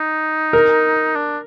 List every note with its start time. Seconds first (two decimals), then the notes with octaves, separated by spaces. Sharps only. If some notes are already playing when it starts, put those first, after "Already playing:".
Already playing: D#4
0.53 A#4
1.16 D4